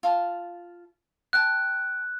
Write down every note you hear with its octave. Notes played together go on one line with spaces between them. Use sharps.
F4 A5
G5 A5 F#6